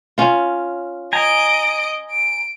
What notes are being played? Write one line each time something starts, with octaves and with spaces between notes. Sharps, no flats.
C#4 F4
D#5 G#5 A#5 D7
D7